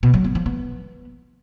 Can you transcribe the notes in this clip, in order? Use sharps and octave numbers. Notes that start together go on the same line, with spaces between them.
B2
F#3
B3
F3
B3